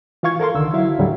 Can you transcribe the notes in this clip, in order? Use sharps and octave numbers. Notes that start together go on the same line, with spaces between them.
E3 F4 F5 C#6 G#6
A4 A#4 F5 C6
C2 D3 D#3 E6
F#3 E4 E5 F5
D#2 A2 D3 F#3 G3